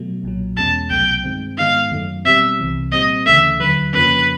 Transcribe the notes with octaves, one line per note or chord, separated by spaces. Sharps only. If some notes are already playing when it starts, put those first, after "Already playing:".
Already playing: B2 F#3 A3
B1 A#2 F#3
E2 B2 G#3 C#4 A5
C2 B2 F#3 A3 G5
G2 D#3 G#3 C4
G#2 D#3 G#3 B3 D#4 F5
F#2 D#3 F#3 A3
B2 G3 C4 E5
C2 C3 E3
A#2 G3 C4 D#5
D2 C#3 E3 A3 E5
D#2 D3 F#3 B4
F2 C#3 F3 A#3 C#4 B4